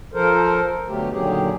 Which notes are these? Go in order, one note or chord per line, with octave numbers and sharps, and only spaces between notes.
F3 A4 A#4 C5
B2 D3 F#3 A3 G4
A#2 D3 D#3 F#3 G4 G#4